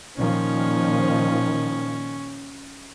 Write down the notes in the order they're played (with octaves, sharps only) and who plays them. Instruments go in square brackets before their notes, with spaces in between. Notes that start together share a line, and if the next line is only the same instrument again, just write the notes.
[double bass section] A#2 D#3 F3 [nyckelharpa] C#4